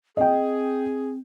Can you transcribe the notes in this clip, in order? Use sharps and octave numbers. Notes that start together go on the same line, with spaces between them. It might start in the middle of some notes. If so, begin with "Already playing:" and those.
C4 G#4 D#5 G5